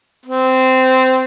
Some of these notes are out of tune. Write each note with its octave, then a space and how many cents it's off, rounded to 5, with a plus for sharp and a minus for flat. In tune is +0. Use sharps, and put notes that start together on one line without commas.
C4 -15